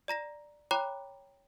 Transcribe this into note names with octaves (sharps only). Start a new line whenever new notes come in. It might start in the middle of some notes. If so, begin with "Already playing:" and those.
D5 A#5 A#6 E7
C#5 G5 A#5 B5 D6 F#6